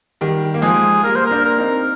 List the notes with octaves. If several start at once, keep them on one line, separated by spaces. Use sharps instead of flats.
D#3 G3
A#3
F3 G#3 G#4
G3 A#3 A#4
C5
A#3 D4 A#4
A#4
C4 D#4